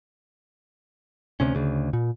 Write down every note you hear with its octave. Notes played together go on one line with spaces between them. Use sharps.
D2 C3 C#4
D2 C#3
A#2